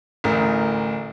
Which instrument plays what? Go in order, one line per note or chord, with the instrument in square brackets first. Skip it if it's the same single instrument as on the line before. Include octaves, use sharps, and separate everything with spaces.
[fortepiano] A1 D2 A#4